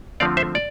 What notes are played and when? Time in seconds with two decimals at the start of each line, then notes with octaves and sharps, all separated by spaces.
0.20 D3 F3 A3 C4 D5 F5
0.37 C5 E5
0.55 D5